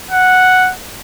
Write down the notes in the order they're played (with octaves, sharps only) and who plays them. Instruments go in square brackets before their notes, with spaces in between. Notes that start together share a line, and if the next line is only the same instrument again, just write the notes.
[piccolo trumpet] F#5